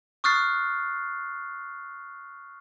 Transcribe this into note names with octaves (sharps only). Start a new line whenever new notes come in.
C#6 D#6 F6 F#6 A6 C7